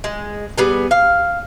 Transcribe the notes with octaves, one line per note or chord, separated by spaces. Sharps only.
G#3
G3 B3 G#4
F5